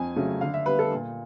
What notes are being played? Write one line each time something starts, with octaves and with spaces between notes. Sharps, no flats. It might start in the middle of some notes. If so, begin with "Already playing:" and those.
Already playing: F2 G#5
C#3 F#3 A3
D3 F5
E5
G3 B3 B4
A4
A#2